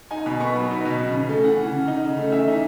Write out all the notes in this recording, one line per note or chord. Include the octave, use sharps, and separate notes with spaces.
D#4 G#5
B2 B5
B3 C#6
F#3 B5
D#4
B2
C#3
C#3
A3
E3 F#5
C#3
C#3
D#4
C#3
A3
E3 E5
D#4